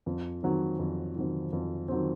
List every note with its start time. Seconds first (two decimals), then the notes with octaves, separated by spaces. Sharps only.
0.06 F2
0.43 D#3 F#3 C4
0.79 F2
1.15 D#3 F#3 C4
1.53 F2
1.88 D#3 F#3 C4